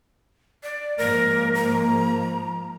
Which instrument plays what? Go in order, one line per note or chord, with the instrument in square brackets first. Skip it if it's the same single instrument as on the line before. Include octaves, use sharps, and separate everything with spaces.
[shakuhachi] D5
[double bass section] G#2 F3 A#3 [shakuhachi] A#4
[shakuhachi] A#5